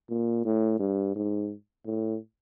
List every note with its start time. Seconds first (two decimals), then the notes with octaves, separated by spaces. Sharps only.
0.09 A#2
0.45 A2
0.79 G2
1.16 G#2
1.86 A2